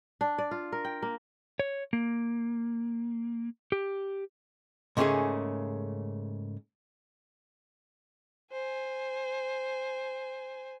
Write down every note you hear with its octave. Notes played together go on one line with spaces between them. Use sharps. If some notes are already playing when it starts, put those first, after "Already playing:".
D4
D5
F4
A#4
G5
A#3
C#5
A#3
G4
G#2 C#3 A3 A#3 C#4 G#4
C5 G#5